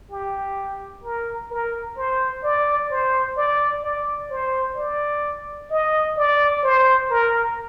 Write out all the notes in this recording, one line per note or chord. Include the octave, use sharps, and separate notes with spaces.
G4
A#4
A#4
C5
D5
C5
D5
D5
C5
D5
D#5
D5
C5
A#4